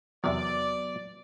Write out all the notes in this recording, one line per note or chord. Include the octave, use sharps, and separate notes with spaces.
E2 C3 D#3 F#3 B3 D5